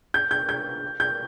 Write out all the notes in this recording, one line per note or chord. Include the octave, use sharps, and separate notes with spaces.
G6
G6
G6
G6